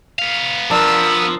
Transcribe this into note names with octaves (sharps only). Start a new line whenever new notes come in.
B3 F5
F3 D4 A#4 E6